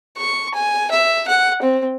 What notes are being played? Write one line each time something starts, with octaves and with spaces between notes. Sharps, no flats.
C#6
G#5
E5
F#5
C4